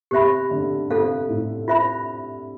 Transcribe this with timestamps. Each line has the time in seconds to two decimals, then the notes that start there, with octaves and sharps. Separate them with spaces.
0.11 C3 G4 C5 E5 B5
0.51 D3
0.90 C3 F4 A4 C5 F5
1.29 A2
1.68 F4 C5 E5 B5